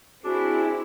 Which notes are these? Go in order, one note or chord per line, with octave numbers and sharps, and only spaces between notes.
C4 D4 E4 F#4 G#4